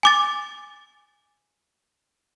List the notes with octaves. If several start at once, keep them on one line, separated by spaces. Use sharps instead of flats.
G#5 D6 A6